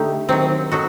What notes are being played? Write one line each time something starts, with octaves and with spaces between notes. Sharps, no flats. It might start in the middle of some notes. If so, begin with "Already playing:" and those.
Already playing: D3 A3 D#4 G4
D#3 F#3 C4
F#3 D#4 F#4 A4